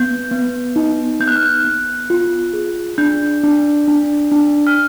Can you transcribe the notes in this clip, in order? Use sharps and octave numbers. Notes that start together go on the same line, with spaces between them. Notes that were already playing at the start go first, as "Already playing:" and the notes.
Already playing: B3 G6
B3
D#4
B3 G6
F#6
F6
F#6
B3
F4
G#4
D4 G6
D4
D4
D4
F6